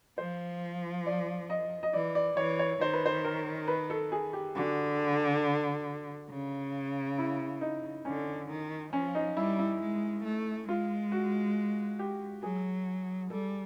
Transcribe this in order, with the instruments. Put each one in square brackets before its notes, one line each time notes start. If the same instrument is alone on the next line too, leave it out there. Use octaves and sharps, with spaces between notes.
[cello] F3 [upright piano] C5
[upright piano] D5
D#5
D#5
[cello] E3 [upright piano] D5
[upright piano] D5
[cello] E3 [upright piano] C#5
[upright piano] C#5
[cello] D#3 [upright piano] C5
[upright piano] B4
C5
A#4
B4
A4
G#4
G4
[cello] D3 [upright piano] F#4
[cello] C#3
[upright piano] E4
D#4
[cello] D3 [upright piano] C#4
[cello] D#3
[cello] F3 [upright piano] C#4
[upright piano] D#4
[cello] G3 [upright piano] E4
[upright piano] E4
[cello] G#3
A3
[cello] G#3 [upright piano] F4
[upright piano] F#4
G4
[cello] F#3 [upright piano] G#4
[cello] G3 [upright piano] A4